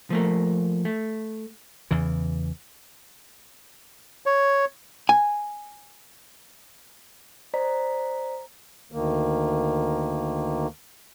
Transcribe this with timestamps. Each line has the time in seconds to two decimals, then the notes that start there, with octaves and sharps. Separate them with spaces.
0.10 F3 A3 A#3
0.85 A3
1.91 E2 C#3 E3
4.26 C#5
5.09 G#5
7.54 C5 D5 D#5 A#5 B6
8.92 D2 D#3 A#3